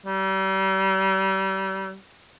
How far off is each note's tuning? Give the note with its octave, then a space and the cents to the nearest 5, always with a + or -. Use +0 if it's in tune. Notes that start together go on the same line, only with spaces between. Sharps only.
G3 -35